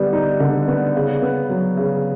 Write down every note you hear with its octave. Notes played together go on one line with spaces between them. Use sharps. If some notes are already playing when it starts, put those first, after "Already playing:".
Already playing: D3 G3 B3
D#4
D3
B3
C#3
B3
F#3
C#3